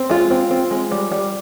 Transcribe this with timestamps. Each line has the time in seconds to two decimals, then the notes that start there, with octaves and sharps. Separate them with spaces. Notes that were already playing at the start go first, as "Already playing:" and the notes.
Already playing: C4
0.10 G#3 F4
0.30 C4
0.50 C4
0.71 G#3
0.91 G3
1.12 G3